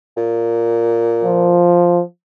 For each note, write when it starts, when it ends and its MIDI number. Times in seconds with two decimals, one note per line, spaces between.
0.17 1.63 46
1.24 2.02 53